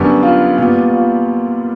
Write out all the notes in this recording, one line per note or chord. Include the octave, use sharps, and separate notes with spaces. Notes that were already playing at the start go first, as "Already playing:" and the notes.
Already playing: F#2 D3 G3 B3
F4
A#2 G3 B3 F4
F4